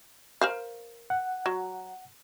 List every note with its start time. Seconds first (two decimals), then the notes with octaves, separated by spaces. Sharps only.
0.41 A#4 C5 F5
1.10 F#5
1.46 F#3